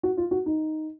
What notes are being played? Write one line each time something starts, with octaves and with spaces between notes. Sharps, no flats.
F#4
F4
F#4
D#4